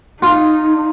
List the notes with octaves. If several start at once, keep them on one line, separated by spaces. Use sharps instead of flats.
D#4 F4